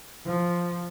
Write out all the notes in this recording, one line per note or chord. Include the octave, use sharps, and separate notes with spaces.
F3